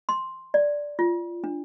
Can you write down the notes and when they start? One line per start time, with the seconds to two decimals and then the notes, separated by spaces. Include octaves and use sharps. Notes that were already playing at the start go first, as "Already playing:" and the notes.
0.09 C6
0.54 D5
0.99 F4
1.44 D4